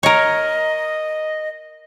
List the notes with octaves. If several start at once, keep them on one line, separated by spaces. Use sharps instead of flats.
A#4 C#5 D#5